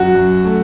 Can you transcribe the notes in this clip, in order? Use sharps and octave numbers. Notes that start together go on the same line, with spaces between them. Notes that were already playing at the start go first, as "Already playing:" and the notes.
Already playing: F#2 F#4
F#2
A3